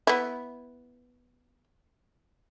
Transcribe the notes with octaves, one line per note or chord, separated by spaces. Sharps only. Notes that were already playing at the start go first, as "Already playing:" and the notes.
B3 E4